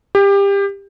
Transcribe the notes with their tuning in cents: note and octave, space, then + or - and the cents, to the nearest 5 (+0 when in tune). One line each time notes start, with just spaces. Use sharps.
G4 +25